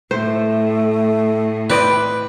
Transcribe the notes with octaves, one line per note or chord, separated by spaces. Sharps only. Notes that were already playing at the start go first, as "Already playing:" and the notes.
A2 A3 C5
C4 B4 D5 D#5